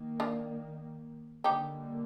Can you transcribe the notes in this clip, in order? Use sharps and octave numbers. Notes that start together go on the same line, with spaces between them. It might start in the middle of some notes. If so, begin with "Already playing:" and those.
Already playing: D#3 A#3
D4 F4
D3 G3 A#3 D#4 G4